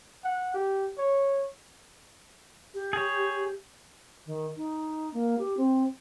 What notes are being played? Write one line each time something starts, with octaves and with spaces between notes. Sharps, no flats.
F#5
G4
C#5
G4
G#4 C#5
D#3
D#4
A#3
G4
C4